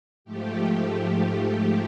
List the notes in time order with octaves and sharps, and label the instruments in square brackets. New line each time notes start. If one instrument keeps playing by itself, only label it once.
[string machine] G#2 F3 A3 G4